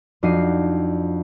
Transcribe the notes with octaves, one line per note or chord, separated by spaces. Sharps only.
F2 D4 D#4 F#4 C7 D#7